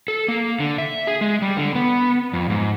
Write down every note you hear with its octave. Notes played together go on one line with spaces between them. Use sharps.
A4
A#3
D3
E5
G#4
G#3
G3
D3
B3
F2
G#2